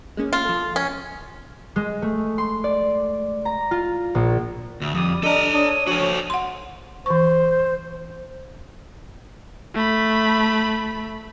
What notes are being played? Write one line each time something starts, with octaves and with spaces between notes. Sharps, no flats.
G#3 A#3 C#4
F4
F3 A4
C#4
G#3
A3
C6
D5
A#5
F4
A#1
D2
F2 G3 G4 D#6
D4 G4 A4 D#5 A#5 D#7
D4 C#5 D#6
F3 F#4 A4 C#5
F#5 C6
E3 C5 C#6
A3 B5